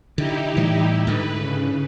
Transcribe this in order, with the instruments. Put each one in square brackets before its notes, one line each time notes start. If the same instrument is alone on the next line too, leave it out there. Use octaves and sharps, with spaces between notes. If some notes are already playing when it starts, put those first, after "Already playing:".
[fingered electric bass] D3 [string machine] D#4 E4 G4
[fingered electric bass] A2 E3 G3
[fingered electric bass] G#2 D3 [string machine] B4
[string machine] C#3